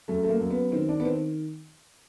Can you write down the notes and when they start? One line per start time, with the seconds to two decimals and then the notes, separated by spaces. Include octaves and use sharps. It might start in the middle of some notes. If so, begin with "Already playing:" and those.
0.08 F#2 A3
0.23 A3
0.29 A#3
0.41 F#2
0.50 B3
0.72 D#3 C4
0.89 D4
1.00 B3
1.04 D#3 C4